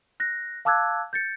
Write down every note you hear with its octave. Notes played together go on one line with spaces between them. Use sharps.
F#6 A#6
F5 A5 D6 E6 F#6 G#6
G6 A6 C#7